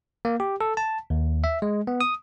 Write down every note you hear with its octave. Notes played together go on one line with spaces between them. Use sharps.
A#3
G4
A4
A5
D#2
E5
G#3
B3
D#6